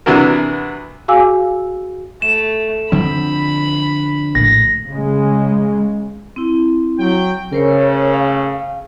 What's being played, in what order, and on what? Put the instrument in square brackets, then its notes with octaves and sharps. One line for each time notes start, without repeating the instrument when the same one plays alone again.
[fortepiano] C3 E3 B3 D4 F#4 A#4
[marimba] F#4 G#4 F5 G#5 D6 E6
[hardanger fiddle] A3 [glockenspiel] E7
[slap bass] D3 F3 C4 [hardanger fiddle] B5
[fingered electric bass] A#1 A2 [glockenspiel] A#6
[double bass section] C#3 G#3
[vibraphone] C4 E4
[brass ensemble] F#3 G5
[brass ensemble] C#3 A3 [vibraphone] A#4 C5 C#5
[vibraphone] F5